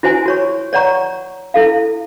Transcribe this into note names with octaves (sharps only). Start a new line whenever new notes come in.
E4 F#4 C5 G#5
F#4 C#5 C#6
C#5 D5 F#5 A#5 C#6
E4 A4 F5